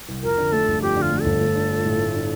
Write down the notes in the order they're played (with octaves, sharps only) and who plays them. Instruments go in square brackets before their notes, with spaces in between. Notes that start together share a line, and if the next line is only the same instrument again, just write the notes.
[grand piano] C2
[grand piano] F2 [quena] A#4
[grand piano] D3
[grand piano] A3 [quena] A4
[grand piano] G1
[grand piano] F2 [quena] G4
[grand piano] D3
[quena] F4
[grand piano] A3
[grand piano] G1 [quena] A4
[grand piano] A3
D4
F4
A2
A3
D4